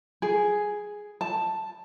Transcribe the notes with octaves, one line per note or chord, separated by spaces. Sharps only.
G#4
A5